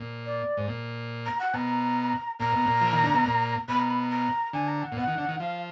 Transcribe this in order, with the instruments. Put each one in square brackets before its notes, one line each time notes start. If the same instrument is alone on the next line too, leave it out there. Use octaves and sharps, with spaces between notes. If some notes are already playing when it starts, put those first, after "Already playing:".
Already playing: [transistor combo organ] A#2
[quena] D5
[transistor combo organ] G#2
A#2
[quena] A#5
F#5
[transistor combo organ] B2 [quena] A#5
[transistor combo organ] A#2 [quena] A#5
[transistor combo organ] B2
A#2
F3
D#3
D3
B2
A#2
[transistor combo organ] B2 [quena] B5
[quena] A#5
B5
A#5
A#5
[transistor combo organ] D3 [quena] G#5
[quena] A#5
F#5
[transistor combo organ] A#2
[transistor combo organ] B2 [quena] F#5
[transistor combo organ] D#3
D3
D#3
[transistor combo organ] F3 [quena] F5